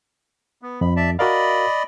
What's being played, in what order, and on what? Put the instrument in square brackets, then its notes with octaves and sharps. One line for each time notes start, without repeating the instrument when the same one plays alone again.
[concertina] B3
[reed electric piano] F2 [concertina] B5
[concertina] D5 E5 A5
[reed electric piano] F#4 A#4 F5 [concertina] D5 D#5 B5